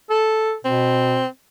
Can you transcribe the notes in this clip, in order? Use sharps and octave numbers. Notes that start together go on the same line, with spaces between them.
A4
B2 C4